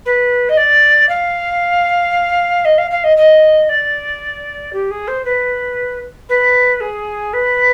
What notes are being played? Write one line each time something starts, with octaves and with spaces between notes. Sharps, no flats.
B4
D#5
D5
F5
D#5
F5
F5
D#5
D#5
D5
G4
G#4
C5
B4
B4
G#4
B4